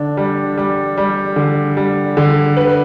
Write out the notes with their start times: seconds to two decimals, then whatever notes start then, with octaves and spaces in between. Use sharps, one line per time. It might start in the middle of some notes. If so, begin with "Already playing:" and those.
Already playing: D3 D4
0.17 G3
0.58 G3
0.98 G3
1.36 D3
1.77 G3
2.17 D3
2.57 B4